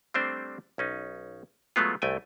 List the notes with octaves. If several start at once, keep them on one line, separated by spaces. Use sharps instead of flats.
G3 A3 C4 D4 C5
B1 C#4 D#4
F#3 G#3 A3 B3 F4
C2 A3 G5 G#5